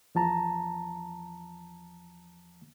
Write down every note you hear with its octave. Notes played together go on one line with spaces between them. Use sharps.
E2 F3 A5 A#5